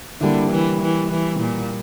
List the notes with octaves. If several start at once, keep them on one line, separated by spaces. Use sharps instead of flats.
D3 G3 A#3 E4
E3
E3
E3
A#2